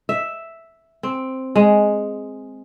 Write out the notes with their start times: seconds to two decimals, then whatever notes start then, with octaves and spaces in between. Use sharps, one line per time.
0.09 E5
1.03 C4
1.56 G#3